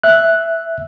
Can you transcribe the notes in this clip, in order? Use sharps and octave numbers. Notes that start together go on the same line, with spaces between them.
E5 F#6